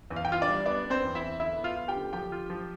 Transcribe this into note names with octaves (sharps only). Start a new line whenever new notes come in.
E2
F5
G5
E2 F4 F5
D4 D5
G3
B3 D4 D5
B3
C4 C5
E2
E4 E5
E2
D3 E4 E5
B3
F4 F5
F4
G4 G5
D3
F3 G4 G5
F4
F3